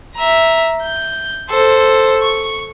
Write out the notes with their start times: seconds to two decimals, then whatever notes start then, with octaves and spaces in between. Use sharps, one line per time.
0.16 E5 A#5
0.83 G6
1.50 A4 C5
2.22 C#6